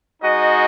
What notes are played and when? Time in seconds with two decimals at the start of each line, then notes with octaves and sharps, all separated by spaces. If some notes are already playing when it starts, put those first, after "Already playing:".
0.22 G#3 D#4 F#4 D#5